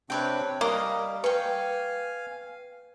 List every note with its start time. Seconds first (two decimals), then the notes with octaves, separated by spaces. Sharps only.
0.10 C3 C4 D4 B4 C#5 G5
0.61 G3 A#3 D#5 F5
1.24 B4 F5 G5 G#5 C#6